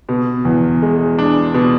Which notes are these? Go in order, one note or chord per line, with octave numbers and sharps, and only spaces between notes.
B2
E2
G#3
D4
B2